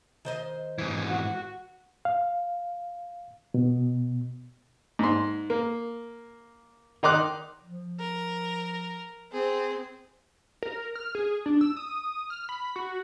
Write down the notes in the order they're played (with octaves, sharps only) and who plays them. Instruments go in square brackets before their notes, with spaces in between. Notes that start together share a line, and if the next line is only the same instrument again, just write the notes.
[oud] D#3 C5 D#5
[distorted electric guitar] G#2 E3
[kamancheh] F#4
[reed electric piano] F5
B2
[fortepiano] G#2 C6
A#3
D#3 D#4 C6 D6 F#6
[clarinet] F3
[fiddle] A#4
C4 G#4
[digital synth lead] A#4
F6
G#4
D4
E6
D#6
F6
B5
F#4